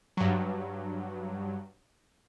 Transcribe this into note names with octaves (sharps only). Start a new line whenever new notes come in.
G2 F#3